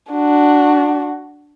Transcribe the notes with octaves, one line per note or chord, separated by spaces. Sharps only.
D4 F#4